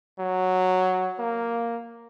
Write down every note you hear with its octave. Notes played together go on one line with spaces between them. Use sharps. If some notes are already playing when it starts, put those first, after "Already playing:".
F#3
A#3